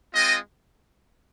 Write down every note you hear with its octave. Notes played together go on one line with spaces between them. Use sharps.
G#3 C4 F4 D#5